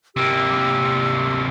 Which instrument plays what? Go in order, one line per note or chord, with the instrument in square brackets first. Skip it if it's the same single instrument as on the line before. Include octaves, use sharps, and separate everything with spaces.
[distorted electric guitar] C3 A#3 [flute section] G4 E6